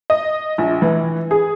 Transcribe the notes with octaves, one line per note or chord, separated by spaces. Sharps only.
D#5
A#1
E3
G#4